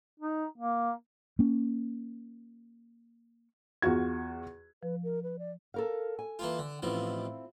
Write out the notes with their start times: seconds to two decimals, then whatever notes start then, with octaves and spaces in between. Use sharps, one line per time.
0.20 D#4
0.58 A#3
1.39 A#3 C#4
3.82 E2 F4 F#4 G#6
4.83 F3 B4
5.04 A#4
5.23 B4
5.39 D5
5.74 A4 A#4 F5
6.19 G#5
6.39 E3 A#3 F4
6.59 D3
6.83 A1 B2 F3 C4 E4 F4